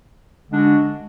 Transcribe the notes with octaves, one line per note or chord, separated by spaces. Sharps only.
D3 G#3 D4 F#4